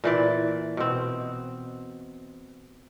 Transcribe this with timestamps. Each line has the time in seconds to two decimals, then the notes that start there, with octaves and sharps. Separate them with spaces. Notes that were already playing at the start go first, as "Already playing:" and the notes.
0.04 A#2 E3 D5
0.77 B2 C4